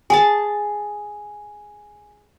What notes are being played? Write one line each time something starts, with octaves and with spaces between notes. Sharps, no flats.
G#4 G#5 A5